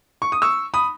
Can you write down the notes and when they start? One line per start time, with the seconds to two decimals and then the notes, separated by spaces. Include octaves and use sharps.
0.22 C#6
0.32 D#6
0.42 C#6 E6
0.74 B5 D#6